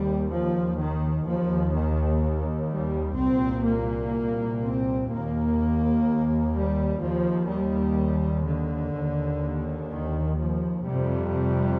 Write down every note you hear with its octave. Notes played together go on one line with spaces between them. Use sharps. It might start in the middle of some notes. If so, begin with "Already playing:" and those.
Already playing: D#2 G3
F3
D#3
D#2 F3
D#3
G3
C2 A#2 C4
A#3
C4
D#2 A#3
G3
D#2 F3
G3
D3
D#2
D#3
F3
F2 C3 G3